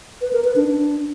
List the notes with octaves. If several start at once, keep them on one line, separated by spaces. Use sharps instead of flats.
B4
A#4
B4
D4
D4